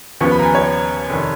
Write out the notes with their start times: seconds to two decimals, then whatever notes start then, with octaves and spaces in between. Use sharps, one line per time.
0.21 D#2 C#3 F3 B3 C#6
0.31 B5
0.39 A#5
0.43 G#5
0.55 C#5
1.10 F1 D#3